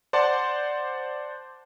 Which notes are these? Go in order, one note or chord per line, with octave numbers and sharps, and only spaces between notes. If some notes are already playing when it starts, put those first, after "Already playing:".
C5 D5 F#5 A5 C6